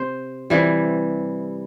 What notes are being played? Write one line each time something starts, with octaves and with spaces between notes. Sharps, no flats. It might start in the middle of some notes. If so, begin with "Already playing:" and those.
Already playing: C3 C5
C3 E3 G3